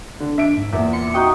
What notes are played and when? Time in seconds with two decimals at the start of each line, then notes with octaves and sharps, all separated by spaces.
0.20 D3
0.38 D4 E5 D7
0.57 G#2
0.73 E2 A#2 E5
0.93 C6 C#7
1.14 D#4 F#4 D#5 G5